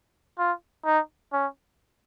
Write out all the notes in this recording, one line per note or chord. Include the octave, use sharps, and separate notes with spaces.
F4
D#4
C#4